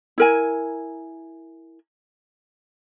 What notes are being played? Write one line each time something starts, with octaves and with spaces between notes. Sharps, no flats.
E4 A#4 G#5